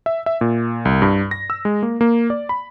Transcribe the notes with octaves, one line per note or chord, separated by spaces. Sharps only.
E5
E5
A#2
C2
G2
A#6
E6
G#3
A#3
A#3
D5
B5